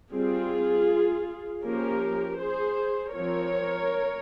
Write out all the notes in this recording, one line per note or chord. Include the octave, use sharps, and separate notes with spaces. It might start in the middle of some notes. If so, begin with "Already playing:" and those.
G3 C4 F4 G#4
F3 A#3 C#4 G4 A#4
G#4 C5
F3 C4 A#4 C#5